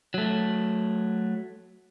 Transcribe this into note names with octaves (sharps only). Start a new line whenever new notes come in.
F#3 A3